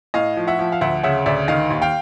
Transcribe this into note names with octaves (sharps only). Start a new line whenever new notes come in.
A2 D#5 F5
F3
E5 F#5
F3
F5
D2 E5 F#5
C#3 E5 F#5
D2 D5 E5
D#3 D#5 F5
D#2
F5 G5